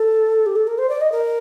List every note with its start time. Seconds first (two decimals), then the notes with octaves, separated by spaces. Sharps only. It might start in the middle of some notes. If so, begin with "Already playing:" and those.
Already playing: A4
0.46 G4
0.55 A4
0.67 A#4
0.78 C5
0.89 D5
1.00 D#5
1.11 A#4